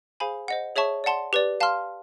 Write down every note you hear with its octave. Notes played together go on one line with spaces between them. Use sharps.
G#4 C5 F5 G#5 B5
C5 D#5 F#5
G#4 C#5 E5 A5 C#6
D5 F#5 A5 C6
G4 B4 D5
F5 A5 C6 F6